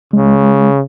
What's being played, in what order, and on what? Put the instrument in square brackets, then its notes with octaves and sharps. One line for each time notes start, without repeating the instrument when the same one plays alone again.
[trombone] C#3 [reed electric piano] G#3